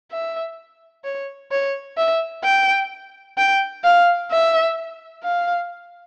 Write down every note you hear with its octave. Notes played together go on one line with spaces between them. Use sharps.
E5
C#5
C#5
E5
G5
G5
F5
E5
F5